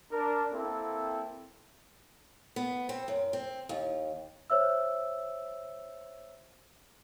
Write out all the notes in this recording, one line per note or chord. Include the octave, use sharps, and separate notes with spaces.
D4 A#4
A#3 C4 E4 A4
B3
C4
F#2
C4
D#2
C5 C#5 E5 E6